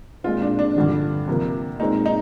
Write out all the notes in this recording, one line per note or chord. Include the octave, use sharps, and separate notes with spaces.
A#2 G#3 C4 F4
D4
D4
G2 D3 F3
C3 F3 A#3
A#2 G#3 C4 D#4
D#4